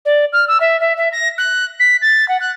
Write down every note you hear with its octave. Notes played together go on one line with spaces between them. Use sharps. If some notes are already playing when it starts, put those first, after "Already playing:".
D5
F6
E6
E5
E5
E5
A#6
F#6
B6
A6
F#5
F#6